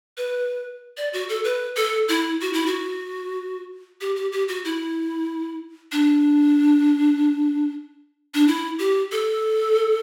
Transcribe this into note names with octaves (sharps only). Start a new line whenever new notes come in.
B4
D5
F#4
A4
B4
A4
E4
F#4
E4
F#4
G4
G4
G4
F#4
E4
D4
D4
E4
G4
A4